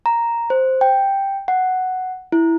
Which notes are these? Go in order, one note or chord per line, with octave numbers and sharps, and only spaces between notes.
A#5
C5
G5
F#5
E4